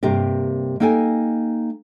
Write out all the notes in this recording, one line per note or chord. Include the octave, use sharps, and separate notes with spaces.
G2 C3 A#3 G4 A#4
A#3 D#4 A4 G5 G#5